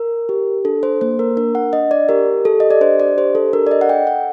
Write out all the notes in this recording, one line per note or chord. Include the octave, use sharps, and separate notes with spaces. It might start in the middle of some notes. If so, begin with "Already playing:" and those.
Already playing: A#4
G4
D4 A4
C5
A#3 C5
A#4
D4 A#4
F#5
D4 D#5
D5
G4 A#4
G4 A4
D#5
D5
D4 C5
D5
G4 C5
A4
D4 A#4
D5
D#5
F#5
A4 G5
F#5